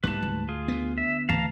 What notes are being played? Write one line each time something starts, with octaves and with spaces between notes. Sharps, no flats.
G#2 G3 A#3 E4 B4 A5
D2
F4 G#4
D3 B3
E5
D2 E3 F5 A5 A#5